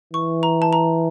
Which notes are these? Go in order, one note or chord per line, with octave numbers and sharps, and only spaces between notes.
E3 C#6
A#5
A5
A#5